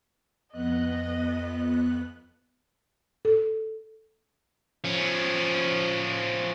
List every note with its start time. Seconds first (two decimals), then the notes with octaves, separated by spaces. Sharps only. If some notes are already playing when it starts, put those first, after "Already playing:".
0.52 F2 B3 D#5 F#6
3.25 A4
4.84 F3 C#4